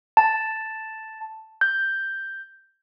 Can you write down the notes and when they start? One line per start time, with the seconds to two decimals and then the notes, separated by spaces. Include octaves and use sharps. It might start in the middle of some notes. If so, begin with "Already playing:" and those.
0.17 A5
1.61 G6